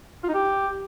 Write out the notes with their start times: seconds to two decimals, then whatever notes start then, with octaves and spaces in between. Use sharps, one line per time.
0.24 F4
0.29 D#4
0.34 G4